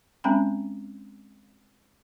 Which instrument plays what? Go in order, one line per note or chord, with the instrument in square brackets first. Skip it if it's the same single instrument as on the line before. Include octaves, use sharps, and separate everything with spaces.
[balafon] G#3 C4 C#4 G5 A#5 B5